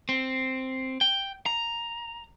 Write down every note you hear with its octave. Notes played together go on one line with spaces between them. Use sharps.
C4
G5
A#5